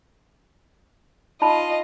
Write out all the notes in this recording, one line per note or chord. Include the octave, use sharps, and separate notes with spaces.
D#4 F4 D#5 A5 B5